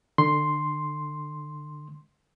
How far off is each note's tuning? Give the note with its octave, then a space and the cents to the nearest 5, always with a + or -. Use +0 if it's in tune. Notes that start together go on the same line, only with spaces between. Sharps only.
D3 +25 C6 +0